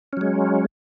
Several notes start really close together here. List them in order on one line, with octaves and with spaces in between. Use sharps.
C#4 F#3 G#3